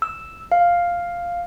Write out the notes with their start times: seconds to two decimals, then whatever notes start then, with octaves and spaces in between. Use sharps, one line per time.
0.02 E6
0.52 F5